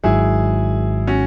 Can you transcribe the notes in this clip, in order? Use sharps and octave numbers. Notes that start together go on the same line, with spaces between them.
G#1 G#2 F#3 E4 G#4
C#4 F#4